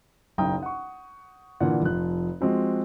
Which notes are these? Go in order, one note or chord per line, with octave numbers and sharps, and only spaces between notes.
F#1 B1 G5 A#5 D#6
F#5 C#6
A#2 D3 E3 F#5
F1 F3 F#6
F3 G#3 C4 F#4